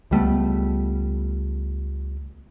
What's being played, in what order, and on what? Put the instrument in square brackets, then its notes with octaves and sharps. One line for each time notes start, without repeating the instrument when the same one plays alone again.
[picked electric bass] C#2 G3 A3 B3